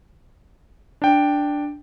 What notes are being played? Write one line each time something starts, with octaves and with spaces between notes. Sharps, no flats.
D4 G5